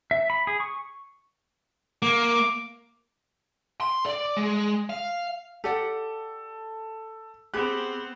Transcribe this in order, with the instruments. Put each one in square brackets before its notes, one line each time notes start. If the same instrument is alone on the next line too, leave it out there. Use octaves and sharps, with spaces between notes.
[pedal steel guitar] E5
B5
G#4
C#6
[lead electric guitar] A#3 [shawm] D6
[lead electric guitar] C6
D5
G#3
F5
[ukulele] G4 D5 F#5 [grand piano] A4
[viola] B3 C4 [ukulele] G4 G#4 [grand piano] F#6